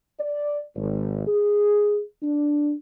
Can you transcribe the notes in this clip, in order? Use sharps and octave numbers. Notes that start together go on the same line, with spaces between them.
D5
G#1
G#4
D4